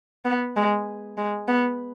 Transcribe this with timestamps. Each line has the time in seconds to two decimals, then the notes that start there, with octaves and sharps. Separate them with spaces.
0.25 B3
0.56 G#3
1.18 G#3
1.48 B3